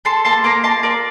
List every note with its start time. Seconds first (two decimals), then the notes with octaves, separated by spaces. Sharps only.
0.05 A4 A5 C6
0.25 A#3 A5 C6
0.44 A#3 A#5 D6
0.64 F4 A5 C6
0.83 A4 A#4 D5